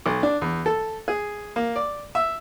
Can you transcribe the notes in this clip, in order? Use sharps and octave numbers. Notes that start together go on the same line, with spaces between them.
B1
D4
E2
A4
G#4
A#3
D5
E5